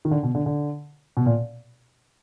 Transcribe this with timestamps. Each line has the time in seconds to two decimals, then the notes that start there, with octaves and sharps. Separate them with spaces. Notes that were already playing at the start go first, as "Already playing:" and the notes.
0.05 D#3
0.11 D3
0.23 B2
0.35 D3
0.46 D3
1.17 B2
1.26 A#2